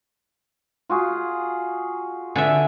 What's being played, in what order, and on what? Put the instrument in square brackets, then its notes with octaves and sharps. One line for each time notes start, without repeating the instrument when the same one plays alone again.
[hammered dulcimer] F4 F#4 G#4
[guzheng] D3 E5 [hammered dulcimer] G#5